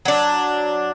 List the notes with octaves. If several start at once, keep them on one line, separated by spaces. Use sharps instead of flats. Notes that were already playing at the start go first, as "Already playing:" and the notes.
F#3 D4